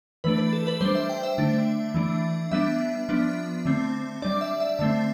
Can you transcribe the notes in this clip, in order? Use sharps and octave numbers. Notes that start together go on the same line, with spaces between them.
E3 A3 D4 B4
B4
A4
B4
G3 D4 C5
E5
G5
E5
D3 A3 D4
E3 A3 D4
G3 B3 D4 E5
F3 B3 D4
D3 A3 C4
G3 D4 D5
E5
E5
D3 A3 C4 E5